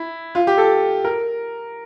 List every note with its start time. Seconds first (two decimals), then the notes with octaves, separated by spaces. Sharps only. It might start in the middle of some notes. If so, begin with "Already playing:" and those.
Already playing: E4
0.35 F4
0.47 G4
0.58 A4
1.04 A#4